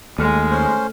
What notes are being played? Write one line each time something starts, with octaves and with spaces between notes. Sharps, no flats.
D#2 G#3 A3 A4 F6
C#4 C5